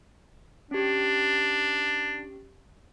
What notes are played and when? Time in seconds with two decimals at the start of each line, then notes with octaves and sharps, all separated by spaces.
0.71 C#4 D4 G4